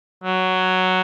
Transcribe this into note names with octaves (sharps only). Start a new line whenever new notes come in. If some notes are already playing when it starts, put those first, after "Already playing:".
F#3